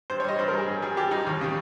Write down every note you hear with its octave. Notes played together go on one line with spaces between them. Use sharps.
G2 C5
C#5
G3 D#5
G2 C5
A#4
G3 G#4
G2
G3 G#4
G2 G4
G3 D#4
D#2
C#3 G3